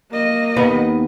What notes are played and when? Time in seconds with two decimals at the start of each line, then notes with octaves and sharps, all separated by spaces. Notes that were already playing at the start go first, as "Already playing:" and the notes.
0.11 A#3 D#5
0.56 D#2 B3 D#4